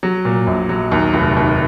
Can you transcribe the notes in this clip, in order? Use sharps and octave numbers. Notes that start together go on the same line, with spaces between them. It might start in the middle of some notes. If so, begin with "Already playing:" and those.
F#3
A#2
A#1
F#3
D#2
F1
D#2